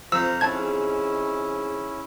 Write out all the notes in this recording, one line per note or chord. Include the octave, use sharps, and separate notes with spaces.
F2 F4 C5 A#5 E6
G#2 C#4 E4 A5 G#6